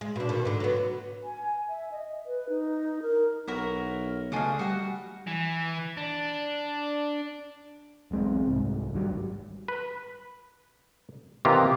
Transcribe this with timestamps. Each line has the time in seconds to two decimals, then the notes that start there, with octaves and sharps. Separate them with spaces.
0.01 G#3
0.16 B2 D4
0.29 B2 D#3
0.45 G#2 D3
0.60 F#3 B3
1.24 G#5
1.69 E5
1.91 D#5
2.26 B4
2.49 D#4
3.02 A#4
3.48 B1 E4 F#4 A#4
4.32 C#2 A3 D4 F#4 G#4 F5
4.59 G3 F#4 F#5
5.27 E3
5.97 D4
8.11 E1 B1 G#3 C4
8.46 C2 G#2
8.93 G#1 G2 F#3 G3
9.68 B4
11.45 C3 D#3 E3 A#3 F4 G4